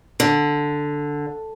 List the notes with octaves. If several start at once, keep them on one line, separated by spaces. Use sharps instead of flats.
D3